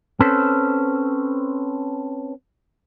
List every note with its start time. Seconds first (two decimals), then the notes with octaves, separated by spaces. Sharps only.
0.20 C4 C#4 A4 B4 C5